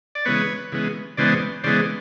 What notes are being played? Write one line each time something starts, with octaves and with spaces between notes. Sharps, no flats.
D5
C#3 E3 G#3 B3 B4 C#5
C#3 E3 G#3 B3
C#3 E3 G#3 B3 C5 D5
C#3 E3 G#3 B3 C5 D5